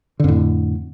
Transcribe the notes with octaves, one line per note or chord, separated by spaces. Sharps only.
F2 A2 D3